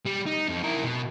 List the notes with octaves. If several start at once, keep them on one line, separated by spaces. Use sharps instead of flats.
G3
D#4
F2
E4 A#4
B2